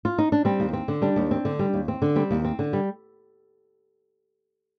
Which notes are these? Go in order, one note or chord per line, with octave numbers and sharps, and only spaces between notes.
F4
D#4
D4
G3 C4
D#2
C4
D3
G3 D4
D#2
C4
D3
G3
D#2
C4
D3
G3 C4
D#2
C4
D3
G3